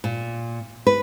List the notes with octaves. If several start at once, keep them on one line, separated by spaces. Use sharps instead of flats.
A#2
B4